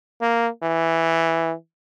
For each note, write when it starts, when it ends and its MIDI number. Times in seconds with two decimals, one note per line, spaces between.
0.21 0.48 58
0.63 1.53 52